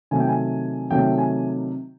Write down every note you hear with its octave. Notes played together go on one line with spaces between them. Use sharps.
C3 D#3 F#3 A3 G#5
G5
G#5
C3 D#3 F#3 A3 G5
G#5